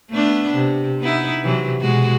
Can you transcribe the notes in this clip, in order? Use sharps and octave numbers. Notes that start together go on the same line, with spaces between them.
A3 B3 D4
C3
B3 D#4 E4
C3 E3 F#3
B2 G#3 F#4